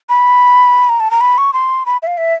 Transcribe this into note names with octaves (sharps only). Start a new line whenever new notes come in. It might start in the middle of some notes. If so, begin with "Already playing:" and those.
B5
A#5
A5
A#5
B5
C#6
C6
B5
E5
F5
E5